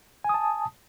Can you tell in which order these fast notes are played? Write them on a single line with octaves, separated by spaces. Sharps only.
G#5 D#6 A5